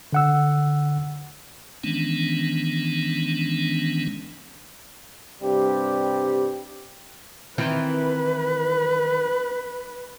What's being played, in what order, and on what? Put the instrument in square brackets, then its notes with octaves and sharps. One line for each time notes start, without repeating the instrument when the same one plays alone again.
[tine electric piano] D3 F#5 E6
[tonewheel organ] D#3 E3 G#3 B3 C#4 D4
[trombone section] G2 C3 G3 G4
[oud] D#3 E3 C4 [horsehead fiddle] B4